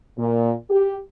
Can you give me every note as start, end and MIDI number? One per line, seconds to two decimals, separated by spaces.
0.18 0.52 46
0.70 0.94 67